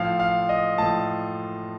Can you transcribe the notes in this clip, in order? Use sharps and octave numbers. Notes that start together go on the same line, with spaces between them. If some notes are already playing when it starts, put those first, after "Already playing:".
Already playing: A2 F3 F5
F5
D#5
A2 F3 A5